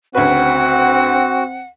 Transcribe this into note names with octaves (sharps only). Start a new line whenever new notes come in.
D2 C#3 C4 F#4 B4 F#5